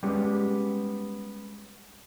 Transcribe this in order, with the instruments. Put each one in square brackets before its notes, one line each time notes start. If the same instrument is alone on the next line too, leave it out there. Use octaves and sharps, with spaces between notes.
[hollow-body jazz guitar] G3 G#3 B3 C#4 G4